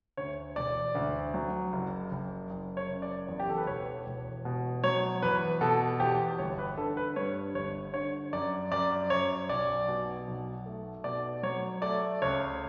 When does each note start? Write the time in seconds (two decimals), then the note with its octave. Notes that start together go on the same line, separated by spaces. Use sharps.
0.17 D2 C#5
0.56 E1 D5
0.95 D2
1.34 F#3
1.73 F#1
2.11 F#1
2.50 F#1
2.77 C#5
2.89 C#3
3.02 D5
3.28 E2
3.40 G4
3.49 A4
3.58 B4
3.66 E1 C#5
4.06 E1
4.45 B2
4.84 F#3 C#5
5.22 E2 B4
5.61 B2 A4
6.00 E2 G4
6.39 G1 C#5
6.59 B4
6.77 D3 A4
6.97 B4
7.16 G2 C#5
7.55 G1 C#5
7.94 D3 C#5
8.33 F#2 D5
8.71 F#2 D5
9.10 F#2 C#5
9.49 B1 D5
9.88 B2
10.27 B1
10.66 A3
11.04 B2 D5
11.43 F#3 C#5
11.82 A3 D5
12.22 C#2 C#5